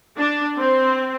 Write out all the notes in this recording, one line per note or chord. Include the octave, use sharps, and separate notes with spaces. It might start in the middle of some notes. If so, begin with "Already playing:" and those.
D4
C4